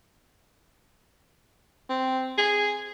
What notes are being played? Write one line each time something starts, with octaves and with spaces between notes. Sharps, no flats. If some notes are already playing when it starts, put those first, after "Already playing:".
C4
G#4